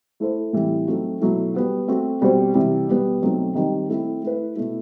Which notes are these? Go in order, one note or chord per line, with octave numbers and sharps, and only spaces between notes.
A3 E4 A4 C5
A2 E3 G3 C4
F#3 A3 C4 D#4 F#4
B2 F#3 A3 E4
G3 B3 F#4
A3 C4 F#4
B2 G3 C4 F#4 C5
C3 E3 G3
B2 G3 B3
B2 F#3 A3 C4 D#4
D#3 G3 C4 D#4
A3 C4 E4
A3 E4 B4
B2 A3 E4